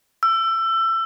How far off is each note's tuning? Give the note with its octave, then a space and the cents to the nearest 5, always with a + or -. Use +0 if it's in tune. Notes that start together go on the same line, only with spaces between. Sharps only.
E6 +25